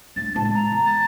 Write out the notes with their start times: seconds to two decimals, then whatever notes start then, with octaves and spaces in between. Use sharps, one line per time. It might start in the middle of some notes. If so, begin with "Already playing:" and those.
0.16 A3 D4 A6
0.36 A2 G#3 A5
0.54 A#5
0.72 E2
0.86 A6